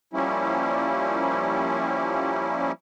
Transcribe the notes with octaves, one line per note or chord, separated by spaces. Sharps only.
F3 G3 A#3 C#4 E4